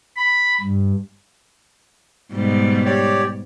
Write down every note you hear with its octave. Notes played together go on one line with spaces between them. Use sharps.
B5
G2
G#2 B2 G3
G4 C#5 D5